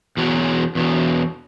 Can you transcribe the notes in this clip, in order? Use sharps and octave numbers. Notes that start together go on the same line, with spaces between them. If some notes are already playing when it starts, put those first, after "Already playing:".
E2 B2 F#3
E2 B2 F#3